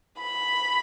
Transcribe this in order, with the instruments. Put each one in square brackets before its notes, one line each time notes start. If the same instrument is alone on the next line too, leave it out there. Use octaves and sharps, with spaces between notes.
[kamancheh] B5